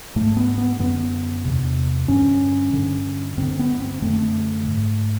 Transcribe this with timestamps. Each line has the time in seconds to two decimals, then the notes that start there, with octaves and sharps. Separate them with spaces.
0.16 G#2 A3
0.37 B3
0.58 B3
0.79 F#2 D3 B3
1.44 E2 C3
2.08 G2 D3 C#4
2.73 G2 D3
3.37 G2 D3 C4
3.59 B3
3.80 C4
4.02 F#2 D3 A3
4.67 G#2